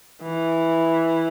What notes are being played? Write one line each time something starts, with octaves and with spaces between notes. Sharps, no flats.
E3